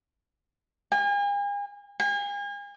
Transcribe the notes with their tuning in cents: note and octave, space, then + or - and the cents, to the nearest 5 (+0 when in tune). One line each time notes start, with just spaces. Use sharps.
G#5 -40
G#5 -40